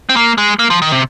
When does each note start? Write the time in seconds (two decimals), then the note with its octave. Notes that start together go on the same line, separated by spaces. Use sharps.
0.09 C4
0.16 A#3
0.38 G#3
0.59 A#3
0.70 F3
0.82 D#3
0.92 C3